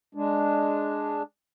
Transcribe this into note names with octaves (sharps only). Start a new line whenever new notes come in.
G#3 D4